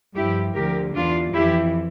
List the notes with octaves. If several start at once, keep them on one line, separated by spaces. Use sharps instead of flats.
G2 F3 E4 G4
D2 D3 F3 G4 A#4
E2 E3 D4 F4
F2 E3 E4 G4